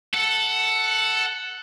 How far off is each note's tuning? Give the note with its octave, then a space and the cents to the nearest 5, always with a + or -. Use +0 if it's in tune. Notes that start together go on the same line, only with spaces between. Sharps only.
A4 +0 F#5 +5